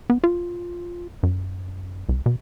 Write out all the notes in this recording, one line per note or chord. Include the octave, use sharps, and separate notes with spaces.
B3
F4
F#2
C2
B2